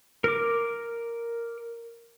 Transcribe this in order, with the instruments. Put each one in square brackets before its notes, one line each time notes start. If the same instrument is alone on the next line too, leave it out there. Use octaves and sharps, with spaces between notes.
[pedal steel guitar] A#4 D6